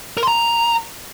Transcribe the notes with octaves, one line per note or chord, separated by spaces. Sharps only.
A#4
C6
A#5